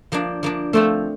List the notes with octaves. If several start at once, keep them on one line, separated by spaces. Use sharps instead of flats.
F3 A#3 D4
F3 A#3 D4
F3 A3 C4 F4